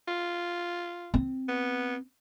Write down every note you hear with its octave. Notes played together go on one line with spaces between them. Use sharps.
F4
C4
B3